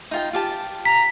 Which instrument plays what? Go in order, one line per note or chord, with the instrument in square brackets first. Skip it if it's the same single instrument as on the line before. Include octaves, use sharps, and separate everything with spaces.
[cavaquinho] D#4 F4 G5
F4 G4 A5
[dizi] A#5 [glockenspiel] B6